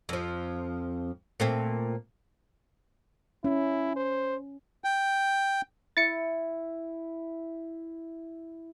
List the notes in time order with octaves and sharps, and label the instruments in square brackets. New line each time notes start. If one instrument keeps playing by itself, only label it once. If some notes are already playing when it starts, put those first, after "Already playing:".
[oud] F2 F3
A#2 A3 C4
[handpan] C#4 [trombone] E4
[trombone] C5
[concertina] G5
[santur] E4 [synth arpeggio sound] A6 C#7